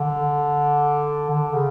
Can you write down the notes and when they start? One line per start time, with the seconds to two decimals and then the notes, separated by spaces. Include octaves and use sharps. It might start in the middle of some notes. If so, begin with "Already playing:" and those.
Already playing: D3
1.30 D3
1.54 C#3